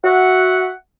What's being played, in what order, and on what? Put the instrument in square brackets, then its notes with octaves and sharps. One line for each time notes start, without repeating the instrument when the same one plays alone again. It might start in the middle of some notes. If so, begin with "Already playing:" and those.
[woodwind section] F#4 E5 F#5